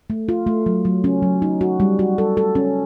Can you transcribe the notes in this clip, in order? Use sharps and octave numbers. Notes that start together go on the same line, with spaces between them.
A3
F4
A3
F#3
F#3
C#4
F#3
D#4
F#4
G3
F#4
A4
A4
C#4